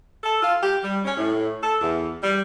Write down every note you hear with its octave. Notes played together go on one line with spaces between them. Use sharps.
A4
F4
G4
G3
C#4
A2
A4
E2
G3